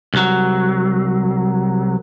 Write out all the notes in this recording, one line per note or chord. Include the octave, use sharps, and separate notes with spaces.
C2 F#3